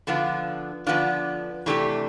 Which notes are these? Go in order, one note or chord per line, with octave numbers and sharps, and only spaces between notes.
D3 F3 B3 D4 F4
D3 F3 B3 D4 F4
C3 E3 A3 D4 G4